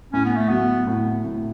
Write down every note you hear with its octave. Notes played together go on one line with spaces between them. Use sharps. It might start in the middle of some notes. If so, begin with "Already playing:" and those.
A2 C#4
B3
A3
F#3 B3
A2
A2